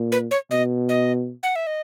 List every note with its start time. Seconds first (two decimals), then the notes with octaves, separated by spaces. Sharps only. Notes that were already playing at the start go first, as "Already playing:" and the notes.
Already playing: A#2
0.12 B4
0.31 C#5
0.51 B2 D#5
0.89 D#5
1.43 F#5
1.56 E5
1.67 D#5